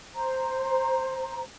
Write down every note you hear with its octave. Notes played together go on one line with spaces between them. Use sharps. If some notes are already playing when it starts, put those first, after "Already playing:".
C5 A#5